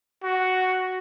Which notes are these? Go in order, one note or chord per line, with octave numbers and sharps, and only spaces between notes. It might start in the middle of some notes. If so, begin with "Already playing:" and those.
F#4